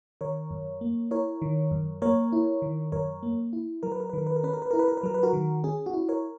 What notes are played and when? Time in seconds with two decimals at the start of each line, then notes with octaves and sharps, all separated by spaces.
0.21 D#3 A#4 C#5
0.51 F#2
0.81 A#3
1.11 E4 A#4 C#5
1.42 D#3
1.71 F#2
2.02 A#3 A#4 C#5
2.32 E4
2.62 D#3
2.92 F#2 A#4 C#5
3.23 A#3
3.53 E4
3.83 F#3 A#4
3.92 B4
4.00 A#4
4.09 B4
4.13 D#3 A#4
4.27 B4
4.36 A#4
4.43 C#4 B4
4.53 A#4
4.62 B4
4.71 E4 A#4
4.79 B4
4.88 A#4
4.97 B4
5.03 F#3 A#4
5.14 B4
5.23 F#4 A#4
5.33 D#3
5.64 C#4 G#4
5.86 F#4
5.93 E4
6.09 A#4 C#5